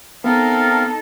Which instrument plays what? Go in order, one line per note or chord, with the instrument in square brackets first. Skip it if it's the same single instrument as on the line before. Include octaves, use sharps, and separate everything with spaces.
[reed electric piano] B3 [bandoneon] C4 A#4 F5 [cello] D#4 A4